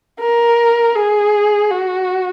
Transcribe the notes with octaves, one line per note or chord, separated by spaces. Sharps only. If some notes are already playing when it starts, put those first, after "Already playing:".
A#4
G#4
F#4